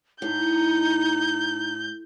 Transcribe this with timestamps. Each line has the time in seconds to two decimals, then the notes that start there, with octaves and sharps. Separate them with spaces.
0.22 A2 D#4 G6